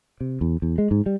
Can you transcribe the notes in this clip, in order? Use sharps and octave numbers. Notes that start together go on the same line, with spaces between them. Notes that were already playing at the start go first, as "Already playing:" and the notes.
C3
E2
E2
G#3
G#2
G3